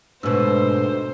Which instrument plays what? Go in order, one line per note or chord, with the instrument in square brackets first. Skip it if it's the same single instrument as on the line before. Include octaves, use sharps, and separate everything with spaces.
[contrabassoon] D2 [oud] G#2 B2 [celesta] B4 E6 [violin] C5